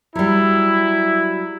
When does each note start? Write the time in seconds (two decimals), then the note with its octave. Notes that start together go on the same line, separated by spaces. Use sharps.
0.15 F#3 G3 E4